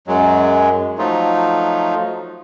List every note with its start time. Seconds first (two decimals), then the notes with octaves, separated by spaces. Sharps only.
0.08 F#2 F#3 G#3
0.99 F3 F#3 A3 D#4 F4